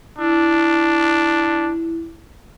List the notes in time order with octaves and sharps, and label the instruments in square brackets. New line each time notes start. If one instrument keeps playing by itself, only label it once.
[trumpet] D4 [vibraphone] E4